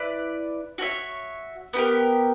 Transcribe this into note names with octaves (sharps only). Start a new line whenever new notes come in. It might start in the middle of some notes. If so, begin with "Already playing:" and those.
Already playing: E4 B4 D5
F#4 C#5 E5
B3 E4 G4 A#4